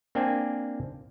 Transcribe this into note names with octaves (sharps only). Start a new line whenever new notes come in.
A#3 C4 D4 G5 G#5